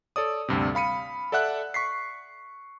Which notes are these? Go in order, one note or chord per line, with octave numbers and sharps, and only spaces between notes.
A4 C#5 D5 D#6
D2 G2 C3
F5 B5 C#7 D#7
A4 D5 E5 F#5 F#6
C#6 B6 C7